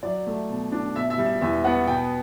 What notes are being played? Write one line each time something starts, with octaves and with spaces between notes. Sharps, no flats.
F#3 D5
A3
B2
D4
B2 E5
E5
G3
E5
E2 E5
B3 F#5
B2 G5